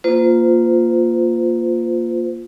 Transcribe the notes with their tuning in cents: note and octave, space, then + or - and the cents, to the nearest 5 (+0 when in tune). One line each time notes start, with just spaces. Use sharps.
A#3 +0 F4 +0 C5 -40